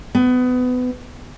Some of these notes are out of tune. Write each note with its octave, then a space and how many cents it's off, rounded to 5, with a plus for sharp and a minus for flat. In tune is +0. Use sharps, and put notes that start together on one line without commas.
B3 +25